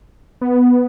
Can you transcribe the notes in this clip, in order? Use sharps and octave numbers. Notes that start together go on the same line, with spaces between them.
B3